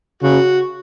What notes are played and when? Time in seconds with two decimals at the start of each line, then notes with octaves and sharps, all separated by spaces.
0.23 C#3 F#4